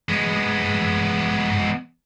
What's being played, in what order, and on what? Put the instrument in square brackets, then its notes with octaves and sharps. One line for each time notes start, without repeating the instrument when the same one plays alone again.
[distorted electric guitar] G#3 B3